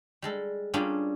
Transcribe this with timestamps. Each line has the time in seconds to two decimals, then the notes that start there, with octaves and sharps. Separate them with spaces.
0.22 G3 G#3 A4
0.74 G3 A#3 C#4 D4 F4 G#4